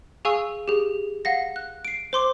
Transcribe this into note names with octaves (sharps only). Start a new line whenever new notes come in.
G#4 F5 G#5 C#6 E6
G4 G#4
F5 F#5 A#6
F#6
C7 D7
C5 C6 D6